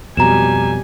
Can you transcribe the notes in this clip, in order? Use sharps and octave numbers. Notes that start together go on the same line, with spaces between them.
F2 B2 F#3 G3 G#5 A#5 E7